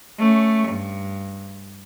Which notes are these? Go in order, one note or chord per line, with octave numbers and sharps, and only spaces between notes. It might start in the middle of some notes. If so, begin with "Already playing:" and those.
A3 C#4
G2